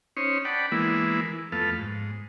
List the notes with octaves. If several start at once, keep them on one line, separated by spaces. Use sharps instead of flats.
C#4 D#4 C5 C#5
D5 F#5 G5 A5 B5
E3 G#3 A#3 B3 E4
F2 A3 B3 F5 A5
G#2